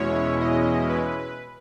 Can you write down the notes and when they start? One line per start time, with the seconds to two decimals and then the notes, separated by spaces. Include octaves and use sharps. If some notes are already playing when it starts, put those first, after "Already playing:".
Already playing: E2 B2 G#3 C#4 E4 C#5
0.40 D#5
0.89 B4